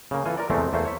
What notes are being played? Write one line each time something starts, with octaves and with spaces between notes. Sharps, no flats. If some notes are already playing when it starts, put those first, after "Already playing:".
C#3 A#3
E3 F4 A4 G#5
A#4 D5
E2 C3 G#3 A3 C4
E2 A3 A#3 C5
C#5 E5